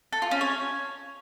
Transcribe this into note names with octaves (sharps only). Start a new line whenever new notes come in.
A4
F4
C#4
C#5